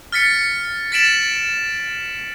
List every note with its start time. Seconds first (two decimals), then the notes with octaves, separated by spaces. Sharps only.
0.12 F6 A6 B6 C#7
0.92 A6 B6 D7 E7 F#7